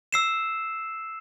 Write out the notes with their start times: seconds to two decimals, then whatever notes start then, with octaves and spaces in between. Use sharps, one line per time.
0.13 E6 C7 E7